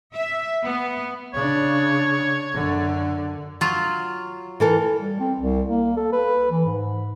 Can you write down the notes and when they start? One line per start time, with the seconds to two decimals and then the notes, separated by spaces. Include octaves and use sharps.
0.15 E5
0.65 B3
1.34 C#3 D4 C#5
2.54 F#2 D3
3.61 F#3 F4
4.60 E3 A4 A#4
4.99 G3
5.20 C4
5.38 C2
5.69 A#3
5.97 A4
6.13 B4
6.51 E3
6.66 G#2